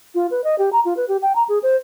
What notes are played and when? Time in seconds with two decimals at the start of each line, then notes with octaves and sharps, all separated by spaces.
0.15 F4
0.31 B4
0.44 D#5
0.58 G4
0.73 A#5
0.85 F4
0.97 B4
1.08 G4
1.22 G5
1.36 A#5
1.49 G#4
1.63 C5